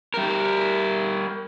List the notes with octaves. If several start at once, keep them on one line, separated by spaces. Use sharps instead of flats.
G3 A#4